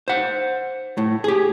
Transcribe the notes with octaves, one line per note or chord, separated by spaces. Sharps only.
C5 F#5
A2
G4 G#4